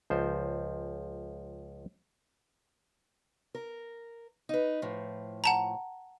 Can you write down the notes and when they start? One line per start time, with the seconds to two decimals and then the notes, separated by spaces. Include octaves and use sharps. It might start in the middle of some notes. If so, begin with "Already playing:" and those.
0.10 C#2 F3 C5
3.55 A#4
4.49 D#4 B4
4.82 A2 F3
5.44 F#5 A5 A#5